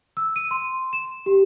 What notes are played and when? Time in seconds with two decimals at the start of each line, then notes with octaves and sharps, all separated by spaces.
0.17 E6
0.36 D#7
0.51 C6
0.93 E7
1.26 G4